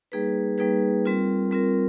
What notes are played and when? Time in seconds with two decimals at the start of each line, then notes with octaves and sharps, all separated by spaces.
0.12 G3 A#3 D#4 G#4 B4
0.58 G3 A#3 D#4 G#4 B4
1.05 G3 C4 F4 A#4
1.51 G3 C4 F4 A#4